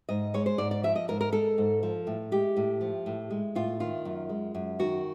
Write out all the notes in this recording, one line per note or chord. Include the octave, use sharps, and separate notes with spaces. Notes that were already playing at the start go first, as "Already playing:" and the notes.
G#2 D#5
G#3 C#5
C5
G#2 D5
D5
F3 E5
D#5
G#2 A#4
A#4
G#3 A4
G#2
F3
A2
G#3 G4
A2
F3
A2
G#3
A2 F4
D#3 F4
F#2
G#3
F#2
D#3 F#4